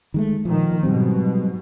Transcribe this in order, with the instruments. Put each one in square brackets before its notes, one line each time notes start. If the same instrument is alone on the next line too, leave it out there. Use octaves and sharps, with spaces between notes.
[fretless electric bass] D#3 G#3 A3
[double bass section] A#2 D#3 [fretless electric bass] F3
[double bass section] G#2 B2 [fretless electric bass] F#3 G3 C4